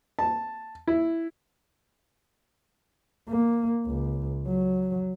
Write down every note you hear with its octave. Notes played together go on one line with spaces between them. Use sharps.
A5
E4
A#3
C#2
F#3